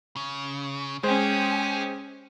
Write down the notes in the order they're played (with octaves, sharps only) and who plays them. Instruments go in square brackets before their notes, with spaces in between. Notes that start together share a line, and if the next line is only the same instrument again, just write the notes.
[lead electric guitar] C#3
[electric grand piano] G#3 C5 [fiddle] C#4 G4 [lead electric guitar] G#4